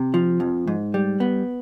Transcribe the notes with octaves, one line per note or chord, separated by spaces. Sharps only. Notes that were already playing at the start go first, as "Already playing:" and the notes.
Already playing: C3
F3
F2
G#2
G3
B3